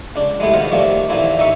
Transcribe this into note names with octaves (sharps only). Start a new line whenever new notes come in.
C#2 D4
G#3 A3 B3 E4 G4
B2 D#3 B3 C5 F5
D#3 F3 G3 A3 A#3 C4
A#2 D#3 E3 A#3 C4 E4
A1 E3 D#4 E5 C#6